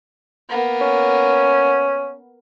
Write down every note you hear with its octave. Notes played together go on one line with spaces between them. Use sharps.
A#3 B3
C#4